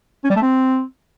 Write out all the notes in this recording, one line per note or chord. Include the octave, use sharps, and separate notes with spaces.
C#4
G3
A3
C4